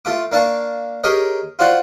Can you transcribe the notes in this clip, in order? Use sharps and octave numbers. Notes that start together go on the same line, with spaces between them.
A3 F4 D6
A#3 D4 F5 A5 C#6
G4 G#4 A#4 C#5 D#5
F4 F#4 C5 D5 F#5 G#5